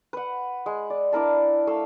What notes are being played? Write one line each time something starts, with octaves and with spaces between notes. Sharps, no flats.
B4 F#5
G#3
D5
D4 E4 A#4 A5
A3 F5 E6